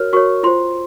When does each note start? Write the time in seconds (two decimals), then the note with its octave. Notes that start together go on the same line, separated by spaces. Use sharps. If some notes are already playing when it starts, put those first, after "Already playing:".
Already playing: F#4 A#4 C#5 F6
0.13 F#4 A#4 C#5 C#6
0.43 F4 C5 C6